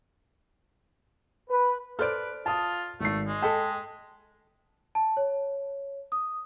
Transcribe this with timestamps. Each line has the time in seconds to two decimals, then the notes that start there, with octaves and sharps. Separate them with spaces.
1.49 B4
1.99 A4 B4 C5 D5 F6 D7
2.46 F4 A5 D#6
3.00 G#1 A3 C7
3.27 G#3
3.42 A4 D#5 G5 A5 B6
4.95 A5
5.17 C#5
6.12 D#6